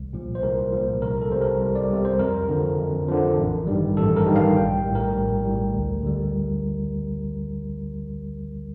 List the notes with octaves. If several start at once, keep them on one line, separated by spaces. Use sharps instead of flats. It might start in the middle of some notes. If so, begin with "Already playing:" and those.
Already playing: C2
A#2 F3
C5
C2 A#4
A#2 F3
C2 A#4
A4
C3 G3 C5
A#4
C2
D5
C3 G3
C5
F2 A#4
D3 F3
F2
D3 F3
A1
G2 D#3 G3
A1 A4
A#4
G2 D#3 G3
F5
A#1 G5
A2 G3
A#4
A#1
A2 G3
D2
D3 G3